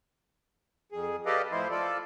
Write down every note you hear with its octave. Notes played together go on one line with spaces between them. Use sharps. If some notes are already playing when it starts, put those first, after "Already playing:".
F2 G#4
G4 A4 B4 D5 D#5 F5
A2 F3 E4 C5
F4 A4 D5